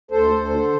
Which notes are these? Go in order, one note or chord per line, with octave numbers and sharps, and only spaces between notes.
D2 A4 C5
D2
D3